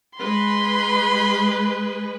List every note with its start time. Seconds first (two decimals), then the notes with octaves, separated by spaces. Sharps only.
0.18 G#3 B4 B5 C6